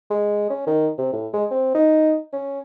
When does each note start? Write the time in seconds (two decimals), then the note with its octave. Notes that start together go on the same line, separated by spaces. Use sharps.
0.10 G#3
0.50 C#4
0.67 D#3
0.98 C3
1.13 A2
1.34 G#3
1.51 C4
1.75 D#4
2.33 C#4